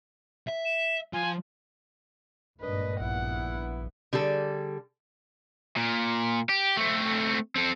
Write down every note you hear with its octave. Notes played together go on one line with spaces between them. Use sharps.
E5
E7
F3 G#5
G#1 G2 A#2 D4 A#4 B4 D#5
A#1 B3 E4 F#5
D3 G3 G#4 A4
A#2
G4
A3 C4
C4 A4